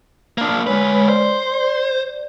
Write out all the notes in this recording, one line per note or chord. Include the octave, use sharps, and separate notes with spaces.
A#3 D4
D2 G#3 B4 C#5
C5 D5